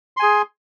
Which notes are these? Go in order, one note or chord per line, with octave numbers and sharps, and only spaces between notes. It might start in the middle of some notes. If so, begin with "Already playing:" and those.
G#4 G#5 C6